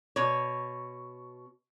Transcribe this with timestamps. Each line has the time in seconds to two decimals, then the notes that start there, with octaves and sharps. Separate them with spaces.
0.16 B2 C#5